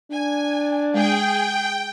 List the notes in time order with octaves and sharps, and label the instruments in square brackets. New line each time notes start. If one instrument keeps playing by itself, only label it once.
[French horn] D4 [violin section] G#5
[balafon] G#3 [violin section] G#4 [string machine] G5